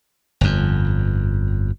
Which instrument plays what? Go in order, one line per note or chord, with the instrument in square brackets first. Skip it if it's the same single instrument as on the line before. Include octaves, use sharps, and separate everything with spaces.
[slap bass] G1 F2